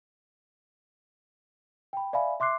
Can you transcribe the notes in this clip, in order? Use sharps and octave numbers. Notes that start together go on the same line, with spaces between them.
G5 B5
D5 E5 F5 G#5 B5
E5 C6 D6 F#6 C7